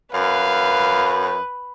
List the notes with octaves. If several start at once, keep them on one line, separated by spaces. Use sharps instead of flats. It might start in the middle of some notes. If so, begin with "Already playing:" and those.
F#2 B4 F5